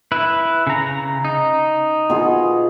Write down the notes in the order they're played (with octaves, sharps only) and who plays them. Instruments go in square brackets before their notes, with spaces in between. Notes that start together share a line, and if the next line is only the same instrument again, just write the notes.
[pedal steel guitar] E4 B4
C#3 A#5
D#4
[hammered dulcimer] B2 F4 G#4